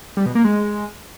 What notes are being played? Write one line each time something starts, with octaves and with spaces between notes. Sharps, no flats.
G3
B2
A#3
G#3